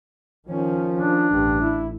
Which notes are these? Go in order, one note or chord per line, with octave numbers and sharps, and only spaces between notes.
D#3 F3 C#4
D4
A1 G2
E4